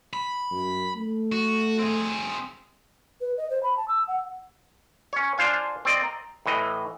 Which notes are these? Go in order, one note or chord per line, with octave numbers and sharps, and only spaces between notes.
B5
F#2
A3
F#4
C4 G#4
B4
D#5
C5
B5
A5
E6
F#5
C#4 C#5
D4 F4 C5 F5 G#5
C4 D5 D#5
A#5
A2 E3 D#5